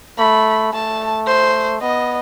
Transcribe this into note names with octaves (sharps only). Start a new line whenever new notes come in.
A3 B5
A3 A5
C5
B3 D#5